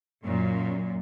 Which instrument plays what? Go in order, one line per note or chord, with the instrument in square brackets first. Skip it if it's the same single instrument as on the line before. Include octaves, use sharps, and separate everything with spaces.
[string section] F#2 A#2